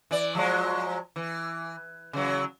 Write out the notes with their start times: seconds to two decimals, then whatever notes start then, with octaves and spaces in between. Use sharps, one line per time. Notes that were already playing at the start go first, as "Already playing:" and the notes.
0.11 E3 D5
0.35 F3 F#3 G#3
1.16 E3
2.13 C#3 E3 F#3